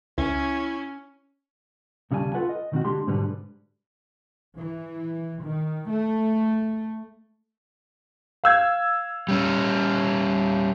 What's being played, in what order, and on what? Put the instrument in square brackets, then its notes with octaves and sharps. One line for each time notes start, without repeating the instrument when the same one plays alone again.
[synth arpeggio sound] C#2 [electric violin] C#4 [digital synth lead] E4
[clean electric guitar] D#2 C#3 G3 F4 G#5 A5
F4 A4 B4 F#5 G#5
D#5
B2 D#3 C4 F#4
D3 G#3 D4 G4 C6
G#2 B2 D3 G3 B3
[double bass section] E3
D#3
A3
[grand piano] F5 E6 G#6
[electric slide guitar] G3 C#4